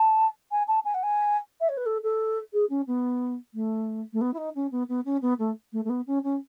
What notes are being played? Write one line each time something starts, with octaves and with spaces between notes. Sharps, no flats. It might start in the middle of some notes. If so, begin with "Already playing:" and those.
Already playing: A5
G#5
A5
G#5
F#5
G#5
E5
C#5
B4
A4
A4
G#4
C#4
B3
A3
A3
B3
E4
D#4
C#4
B3
B3
C#4
B3
A3
A3
A3
B3
C#4
C#4